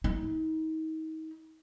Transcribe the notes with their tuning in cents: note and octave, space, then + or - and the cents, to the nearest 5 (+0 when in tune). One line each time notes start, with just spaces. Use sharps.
D#4 +35